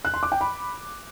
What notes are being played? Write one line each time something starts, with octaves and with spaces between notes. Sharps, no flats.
F#6
C6
D6
G5
B5